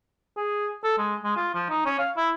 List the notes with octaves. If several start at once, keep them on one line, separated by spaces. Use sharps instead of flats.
G#4
A4
G#3
G#3
F4
F3
D#4
C#4
F5
E4